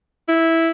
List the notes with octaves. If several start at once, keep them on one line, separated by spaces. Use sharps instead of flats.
E4